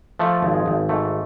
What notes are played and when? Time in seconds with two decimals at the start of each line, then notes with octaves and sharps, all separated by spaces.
0.19 F3 A3
0.42 G#1
0.54 G#3
0.66 G#1
0.89 G#2 A3